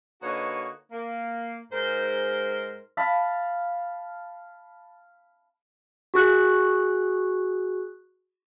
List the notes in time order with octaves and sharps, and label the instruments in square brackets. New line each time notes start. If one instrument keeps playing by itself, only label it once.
[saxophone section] D3 A#3 D#4 F#4 B4 C#5
A#3
G#2 A#4 C5
[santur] F5 A5 B5
[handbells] F#4 G#4 F#6